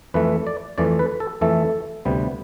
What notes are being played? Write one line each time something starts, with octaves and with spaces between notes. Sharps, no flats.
F2 E3 A3 B4
D5
F2 E3 A3 D5
B4
A4
F2 E3 A3 A4
D2 C3 G3 B3